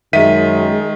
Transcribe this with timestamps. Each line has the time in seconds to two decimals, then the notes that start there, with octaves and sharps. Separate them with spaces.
0.13 F#2 D#3 G#3 E5 B6 D#7